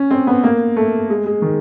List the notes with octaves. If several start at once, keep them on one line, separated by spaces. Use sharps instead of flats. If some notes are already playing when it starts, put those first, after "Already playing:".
Already playing: C#4
C4
B3
A#3
A3
G#3
G#3
D#3